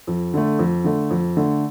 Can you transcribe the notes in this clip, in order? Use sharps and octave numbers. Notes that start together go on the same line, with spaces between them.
F2
D3 A3
F2
D3 A3
F2
D3 A3